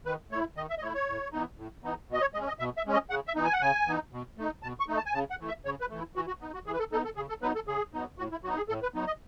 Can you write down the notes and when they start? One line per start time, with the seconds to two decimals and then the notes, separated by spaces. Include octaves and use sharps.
0.06 D#3 B4
0.31 A3 C#5
0.34 E4
0.56 D#3 D#5
0.70 E5
0.78 D#5
0.82 A3 E4 C#5
0.94 C#5
1.08 A2
1.32 E3 B3 D#4
1.58 A2
1.84 E3 B3 D#4
2.09 B2 D#5
2.21 C#5
2.34 G#3 C#4 D#5
2.48 D#5
2.59 B2 E5
2.77 E5
2.86 G#3 C#4
2.93 D#5
3.10 C#3 F#5
3.27 E5
3.35 E3 B3 D#4
3.44 G#5
3.53 F#5
3.61 C#3 G#5
3.87 E3 B3 D#4
4.13 B2
4.38 A3 D#4
4.63 B2 A5
4.80 C#6
4.88 A3 D#4
4.97 A5
5.06 G#5
5.14 C#3 A5
5.31 F#5
5.40 E3 A3
5.48 E5
5.65 C#3 C#5
5.81 B4
5.90 E3 A3
5.98 E4
6.15 E3 F#4
6.27 F#4
6.40 B3 D#4
6.54 F#4
6.66 E3 G#4
6.74 B4
6.79 A4
6.92 B3 D#4 A4
7.05 A4
7.16 C#3 G#4
7.29 A4
7.42 F#3 B3 D#4 B4
7.55 A4
7.67 C#3 G#4
7.93 F#3 B3 D#4
8.18 A2 F#4
8.32 E4
8.44 F#3 B3 D#4 F#4
8.57 G#4
8.69 A2 A4
8.82 B4
8.94 F#3 B3 D#4
9.07 D#5